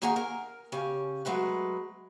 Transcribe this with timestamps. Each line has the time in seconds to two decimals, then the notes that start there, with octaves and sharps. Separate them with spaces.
0.02 D#2 A#3 D#4 G#4 F#5 A#5
0.16 A#4
0.72 C#3 C#4 G4
1.25 F#3 G#3 A3 B4